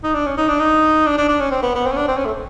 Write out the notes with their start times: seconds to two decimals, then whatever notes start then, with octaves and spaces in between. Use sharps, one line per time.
0.03 D#4
0.14 D4
0.26 C#4
0.37 D#4
0.48 D4
0.59 D#4
1.06 D4
1.17 D4
1.28 D4
1.40 C#4
1.51 C4
1.62 B3
1.75 B3
1.86 C4
1.92 C#4
1.96 D4
2.08 C4
2.17 C#4
2.25 A3